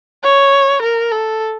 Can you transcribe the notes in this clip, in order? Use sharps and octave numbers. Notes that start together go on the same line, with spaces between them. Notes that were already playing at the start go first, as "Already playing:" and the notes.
C#5
A#4
A4